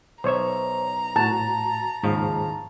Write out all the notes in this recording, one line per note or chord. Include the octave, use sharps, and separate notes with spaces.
B1 C5 C#5 E5 A#5
A2 F#4 A5
D#2 G#2 C#3 F3